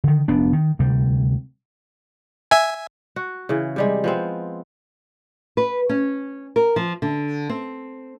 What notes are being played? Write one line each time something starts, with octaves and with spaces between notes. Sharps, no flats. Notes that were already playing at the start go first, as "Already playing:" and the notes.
D3 D#3
F1 B3 D4
D#3
D2 C3 G3
E5 G#5
F#4
C#3 E3
C3 G3 G#3
F3 B3 C4
B4
C#4
A#4
F3
D3
C4